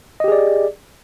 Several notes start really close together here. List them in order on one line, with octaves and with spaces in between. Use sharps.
D#5 G4 G#4 D5